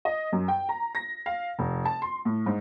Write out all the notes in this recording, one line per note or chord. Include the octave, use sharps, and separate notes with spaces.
D#5
F#2
G5
A#5
A#6
F5
F1
A5
C6
A2
G#2